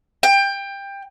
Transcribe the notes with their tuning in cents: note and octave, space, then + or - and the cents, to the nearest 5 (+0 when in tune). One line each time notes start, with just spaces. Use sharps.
G5 +20